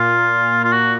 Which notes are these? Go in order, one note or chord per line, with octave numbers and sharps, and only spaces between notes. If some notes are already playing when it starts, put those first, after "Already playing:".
Already playing: A#2 F4
F4
F#4